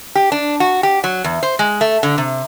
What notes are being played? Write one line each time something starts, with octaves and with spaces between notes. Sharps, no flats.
G4
D4
F#4
G4
F#3
E2
C5
G#3
A3
D3
C3